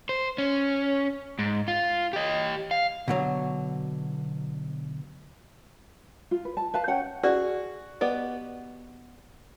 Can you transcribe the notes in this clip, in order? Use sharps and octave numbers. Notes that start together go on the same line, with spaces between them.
C5
C#4
G#2
F4
G4 D#5
F5
B2 D3 F#3
F4
B4
A5
B4 F5 A5
C#4 C#5 F#5 G5
F#4 G#4 D5
B3 G4 D5 D#5